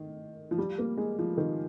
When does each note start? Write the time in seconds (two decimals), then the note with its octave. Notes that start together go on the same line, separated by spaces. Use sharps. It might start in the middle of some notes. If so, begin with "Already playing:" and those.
Already playing: D#3
0.51 F3
0.58 G3
0.78 A#3
0.97 G#3
1.19 F3
1.37 D#3